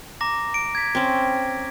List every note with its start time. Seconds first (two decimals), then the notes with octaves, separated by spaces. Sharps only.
0.21 A#5 D6 A#6
0.54 D7
0.75 G#6 B6
0.95 C4 C#4